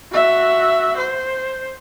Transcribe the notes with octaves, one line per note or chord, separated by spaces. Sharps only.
F#4 E5
C5